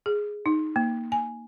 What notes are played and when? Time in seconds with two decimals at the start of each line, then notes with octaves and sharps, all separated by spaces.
0.06 G#4
0.46 D#4
0.76 A#3
1.12 G#5